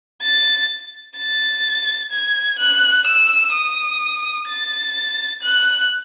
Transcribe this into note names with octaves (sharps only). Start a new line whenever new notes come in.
A6
A6
G#6
F#6
E6
D#6
A6
F#6